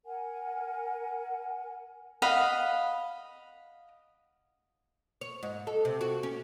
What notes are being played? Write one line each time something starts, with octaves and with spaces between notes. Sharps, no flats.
A#4 F#5 G#5
D#5 F5 F#5 B5
C#5
G#2
A4
C3
F#4
C#4